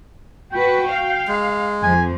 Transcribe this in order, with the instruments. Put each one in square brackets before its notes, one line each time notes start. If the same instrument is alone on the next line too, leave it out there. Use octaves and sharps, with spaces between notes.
[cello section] F#4 B4 [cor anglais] G5
[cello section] F5
[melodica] G#3
[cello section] F2 F3 [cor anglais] G#5